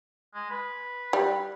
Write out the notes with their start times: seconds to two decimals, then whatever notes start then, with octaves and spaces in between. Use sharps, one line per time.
0.35 G#3
0.50 B4
1.13 G3